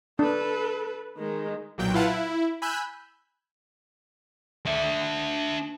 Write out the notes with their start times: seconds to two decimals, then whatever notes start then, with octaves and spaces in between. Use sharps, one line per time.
0.19 D4 A4 B4
1.17 D#3 G#3
1.78 B1 A#2 F#3 G5 G6
1.94 E4 F4 B4 F5 F#5 A5
2.07 E4
2.62 G#5 B5 E6 F#6 G6
4.66 D4 E5